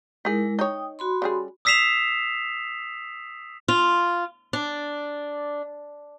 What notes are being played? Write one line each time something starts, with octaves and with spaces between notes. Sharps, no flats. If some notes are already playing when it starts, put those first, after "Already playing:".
G#3 D#4 E4 G#4 A#4
D#4 C#5 G5 D#6
F#4 B5 C6
C#3 G3 G#4
D#6 E6 B6 C7 E7 F7
F4
D4